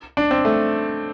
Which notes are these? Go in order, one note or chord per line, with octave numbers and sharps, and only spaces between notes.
D4
C4
A3